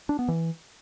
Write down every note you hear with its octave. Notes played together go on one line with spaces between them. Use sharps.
D4
B3
E3